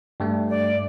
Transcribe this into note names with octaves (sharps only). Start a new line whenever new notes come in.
G2 G3 A3
D5